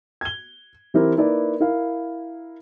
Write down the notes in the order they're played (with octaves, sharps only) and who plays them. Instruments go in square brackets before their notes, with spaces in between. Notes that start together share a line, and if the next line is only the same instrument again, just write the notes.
[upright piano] G#6 G7
E3 C4 E4 G4 A#4
A#3 D#4 E4 B4 D5
E4 A#4 F5